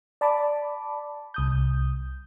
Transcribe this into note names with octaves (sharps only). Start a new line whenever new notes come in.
D5 A5 B5 D6
C2 D#6 G6